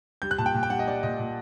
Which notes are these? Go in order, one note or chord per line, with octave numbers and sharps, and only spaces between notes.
G3 G6
F#6
A#2 A5
G5
A#2
G5
G3 F#5
D#5
G3 D5
A#2 D#5
A#2